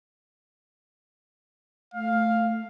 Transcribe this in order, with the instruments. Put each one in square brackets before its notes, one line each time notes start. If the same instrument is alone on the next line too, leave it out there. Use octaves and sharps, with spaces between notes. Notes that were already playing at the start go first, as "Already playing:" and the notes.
[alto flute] A3 [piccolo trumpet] F5